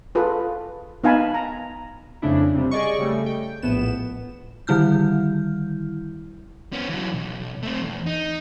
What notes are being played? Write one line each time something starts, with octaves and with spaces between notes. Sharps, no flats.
F4 G#4 A4 B4
B3 D#4 F5 G#5 A5 B5
A#5
F2 C#3 A3 D4 E4
C3 G3
G#4 D5 D#5 C#6
C#3 G3 A3
G5
A#1 A2 B3 E7
D3 D#3 G3 E4 F6 G6
B3 C#4
E3 F#3
B1
A3 C4
E2
D#4